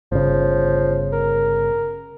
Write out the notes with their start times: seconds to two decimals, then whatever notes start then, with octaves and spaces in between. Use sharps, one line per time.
0.12 G1 C#3 F3
1.12 A#4